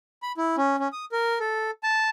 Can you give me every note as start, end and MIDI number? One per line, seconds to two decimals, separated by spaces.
0.22 0.32 83
0.37 0.56 64
0.57 0.76 61
0.79 0.88 61
0.93 1.05 87
1.12 1.39 70
1.40 1.71 69
1.83 2.10 81